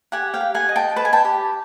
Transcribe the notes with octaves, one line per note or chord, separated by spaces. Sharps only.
G4 F#5 G#5
F5 G5
G4
F#5 G#5
D#5
G5 A5
B4 A5
G#5
G5 A5
G4